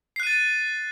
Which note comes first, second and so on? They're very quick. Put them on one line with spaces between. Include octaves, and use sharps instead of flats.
C7 F#6 D#7 A6